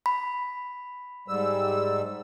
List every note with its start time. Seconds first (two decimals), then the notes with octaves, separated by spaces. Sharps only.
0.06 B5
1.28 G#2 G3 E6